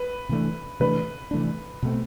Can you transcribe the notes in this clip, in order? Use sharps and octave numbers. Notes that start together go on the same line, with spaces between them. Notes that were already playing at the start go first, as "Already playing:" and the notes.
Already playing: B4
C3 E3 A3 D4
C3 E3 A3 D4 B4
C3 E3 A3 D4
B2 A3 C4